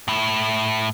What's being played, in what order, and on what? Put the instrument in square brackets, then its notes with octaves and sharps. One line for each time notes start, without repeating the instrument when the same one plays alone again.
[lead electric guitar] A2 E4